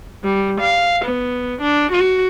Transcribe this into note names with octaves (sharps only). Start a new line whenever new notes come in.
G3
F5
B3
D4
F#4